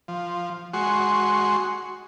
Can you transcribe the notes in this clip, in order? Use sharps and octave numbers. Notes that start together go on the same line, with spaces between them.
F3
G#3 F#4 C6 C#6